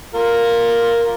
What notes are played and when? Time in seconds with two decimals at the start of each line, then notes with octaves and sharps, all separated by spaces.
0.14 F4 A#4